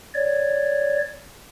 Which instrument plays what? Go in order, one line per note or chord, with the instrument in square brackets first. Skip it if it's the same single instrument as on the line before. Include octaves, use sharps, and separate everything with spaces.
[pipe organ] C#5 D5